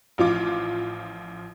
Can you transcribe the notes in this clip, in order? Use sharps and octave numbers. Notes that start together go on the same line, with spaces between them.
A1 F3 F4 D6